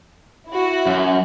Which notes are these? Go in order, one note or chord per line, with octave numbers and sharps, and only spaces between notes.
E4 F#4
F#2